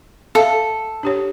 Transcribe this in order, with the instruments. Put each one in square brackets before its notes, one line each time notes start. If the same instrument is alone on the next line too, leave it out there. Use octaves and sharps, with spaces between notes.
[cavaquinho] A4 [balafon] E5 F5
[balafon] D4 G4 C#5